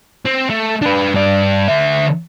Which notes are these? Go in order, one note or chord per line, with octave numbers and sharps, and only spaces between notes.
C4
A3
D4 B4
G2 D5
D3 E5